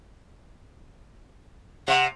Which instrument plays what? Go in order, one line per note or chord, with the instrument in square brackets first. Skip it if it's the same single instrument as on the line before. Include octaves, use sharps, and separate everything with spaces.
[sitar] C3 [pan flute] F#5